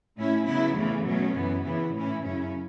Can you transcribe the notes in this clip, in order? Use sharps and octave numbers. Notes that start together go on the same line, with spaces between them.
A2 A3 C#4 E4
C#3 F#3 B3 E4
E2 C#3 E3 A3
B2 F#3 A3 C#4
F#2 E3 B3
C#3 E3 B3 E4
A2 E3 A3 C#4 E4
F#2 C#3 F#3 C#4 E4